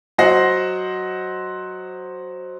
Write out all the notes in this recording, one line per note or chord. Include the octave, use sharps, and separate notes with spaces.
F#3 C5 D#5 F#5 A#6 C7